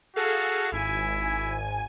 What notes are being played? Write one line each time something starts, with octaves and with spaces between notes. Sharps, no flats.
F#4 G#4 A4 F5
G#1 E4 G#5